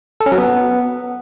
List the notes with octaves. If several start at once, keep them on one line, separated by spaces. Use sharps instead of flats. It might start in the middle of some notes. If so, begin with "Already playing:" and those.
A4
C#4
F#3
B3